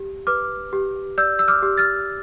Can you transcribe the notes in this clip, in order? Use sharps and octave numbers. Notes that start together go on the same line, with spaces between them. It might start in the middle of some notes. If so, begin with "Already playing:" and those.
Already playing: G4
B4 D6 F6
G4
D5 E6 G6
E6
D6 F6
G4
F6 A6